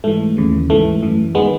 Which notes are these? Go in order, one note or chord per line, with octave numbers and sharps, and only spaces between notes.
G#2 E3 A3
D#2 C#3 E3
G#2 E3 A3
F#2 E3
D#3 G#3 B3